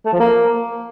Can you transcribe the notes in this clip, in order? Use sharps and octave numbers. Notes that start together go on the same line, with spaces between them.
A3
F3
A#3